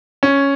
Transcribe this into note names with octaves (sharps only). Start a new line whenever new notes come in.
C#4